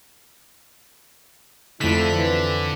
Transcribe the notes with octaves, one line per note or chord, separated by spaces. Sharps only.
F2 D3 A3 E4 B6
E3